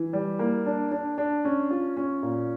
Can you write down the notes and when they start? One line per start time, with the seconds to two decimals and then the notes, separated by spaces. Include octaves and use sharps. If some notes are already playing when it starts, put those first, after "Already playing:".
Already playing: E3
0.13 G3
0.39 A#3
0.66 D4
0.92 D4
1.18 D4
1.45 C#4
1.71 F4
1.97 C#4
2.23 A#2